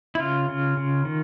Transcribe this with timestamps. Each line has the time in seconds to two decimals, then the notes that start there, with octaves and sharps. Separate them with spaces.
0.15 E4
0.19 C#3 F4
0.49 C#3
0.77 C#3
1.05 D#3